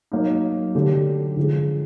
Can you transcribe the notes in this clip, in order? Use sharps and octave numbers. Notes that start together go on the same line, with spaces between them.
F#3 A#3 D#4
D3 F#3 A3 D4 G4
D3 F3 G#3